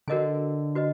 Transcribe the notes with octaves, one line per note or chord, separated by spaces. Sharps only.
D3 F#4 A#4 D#5 G#5
F#4 B4 D#5